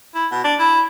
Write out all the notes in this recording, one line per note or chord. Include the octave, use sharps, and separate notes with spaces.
E4
B2
D4
E4